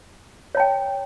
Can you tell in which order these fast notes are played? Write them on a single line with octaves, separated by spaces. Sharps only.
C#5 A5 G5